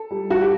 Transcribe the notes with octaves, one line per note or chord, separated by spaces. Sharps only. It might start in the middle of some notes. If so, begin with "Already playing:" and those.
Already playing: A4
G3
F#4
G4